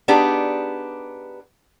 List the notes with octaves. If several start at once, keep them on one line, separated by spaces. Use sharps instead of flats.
B3 D4 D#4 G4 G#4